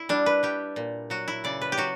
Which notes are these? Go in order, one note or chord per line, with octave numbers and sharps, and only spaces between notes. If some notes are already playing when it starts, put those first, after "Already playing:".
Already playing: E4
G3 D4
B4
G3 G4
A#2
F#3 F#4
E4
C#3 D5
B4
G4
F#3 F#4